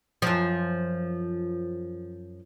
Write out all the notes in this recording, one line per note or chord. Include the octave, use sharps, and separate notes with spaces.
F#2 F3